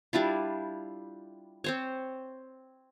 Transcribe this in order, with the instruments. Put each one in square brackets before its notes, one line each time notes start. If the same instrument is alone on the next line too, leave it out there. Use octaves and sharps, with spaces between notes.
[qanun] G3 D4 E4 F4
C4 C5 C#5